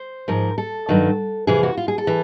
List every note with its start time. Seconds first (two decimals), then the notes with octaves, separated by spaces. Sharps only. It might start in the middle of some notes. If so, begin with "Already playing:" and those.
Already playing: C5
0.28 G#2 F3 A#4
0.58 A4
0.89 G2 D#3 F#3
1.47 F2 C3 E3 G#4
1.63 F#4
1.77 F4
1.88 G#4
1.98 A4
2.07 E3